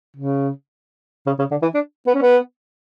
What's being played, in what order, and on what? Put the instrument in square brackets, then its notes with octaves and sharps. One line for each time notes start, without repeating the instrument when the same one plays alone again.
[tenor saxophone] C#3
C#3
C#3
D3
E3
D4
B3
C#4
B3